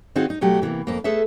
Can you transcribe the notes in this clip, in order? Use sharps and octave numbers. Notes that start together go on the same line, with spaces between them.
D#3 C4 D#4 F4 F#4 G#4
D#4
B2 F#3 A3 G4
C3 E3 A3 A#3
F2 A#3
A3 G#4 A4 B4 E5